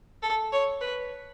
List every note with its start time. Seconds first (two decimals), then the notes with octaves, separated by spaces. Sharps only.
0.23 A4
0.52 C#5
0.81 B4